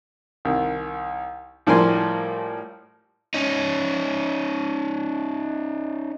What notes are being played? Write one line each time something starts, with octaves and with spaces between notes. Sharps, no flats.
C2 D#3
A2 F3 G3 A#3 G#5 C6
C#4 D#4